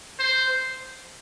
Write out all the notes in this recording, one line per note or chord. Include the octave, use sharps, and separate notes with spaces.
C5